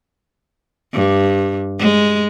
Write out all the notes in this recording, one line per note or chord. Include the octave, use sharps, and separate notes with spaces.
G2
G#3